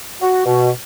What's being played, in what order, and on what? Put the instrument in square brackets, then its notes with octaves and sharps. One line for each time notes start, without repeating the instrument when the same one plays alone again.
[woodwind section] F#4
B2